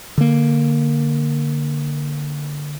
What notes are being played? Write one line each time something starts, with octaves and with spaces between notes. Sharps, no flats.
D3 A#3